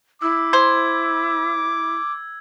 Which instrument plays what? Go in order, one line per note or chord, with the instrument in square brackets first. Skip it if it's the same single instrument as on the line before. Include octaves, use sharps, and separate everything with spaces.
[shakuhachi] E4 [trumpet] D6 [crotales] E6
[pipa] C5 [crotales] G#6